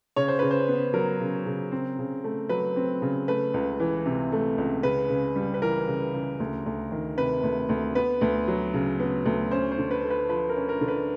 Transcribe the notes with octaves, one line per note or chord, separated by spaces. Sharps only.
C#3 C#5
C5
C#3 B4
C5
B3
F#3 A#4
C#3
C#3
C4
C#3
A3
F#3 B4
C4
C#3
A3 B4
C#2
E3
C3
A3
C#2
C#3 B4
C#3
G3
B4
E3 A#4
C#3
C#3
D2
D2
D#3
C3 B4
D2
D2
B3 B4
D2
F#3
C#3
B3
D2
C#4 C5
C5
D3
B4
A3
B4
F3 B4
A#4
C#4
A#4
D3
B4